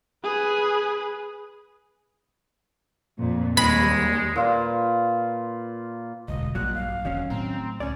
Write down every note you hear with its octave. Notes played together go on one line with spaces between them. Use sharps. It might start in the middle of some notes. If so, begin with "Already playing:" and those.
G#4 B4
F2 A#2
D#2 G3 G#3 B5
A#2 F4 B4
E1 A1 D2 D#5
A#1 G2 A#2 F#3 A#3 F#6
F5
E1 D#3 F#3 C#4
A2 C4 A#5
C#2 C#4 C#5 D5 G#5